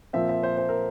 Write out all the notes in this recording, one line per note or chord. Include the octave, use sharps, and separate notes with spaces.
A#2 F3 C4 E5
E5
C5
C5
A#4